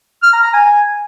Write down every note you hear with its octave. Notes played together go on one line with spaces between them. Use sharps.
F6
A#5
A#5
G#5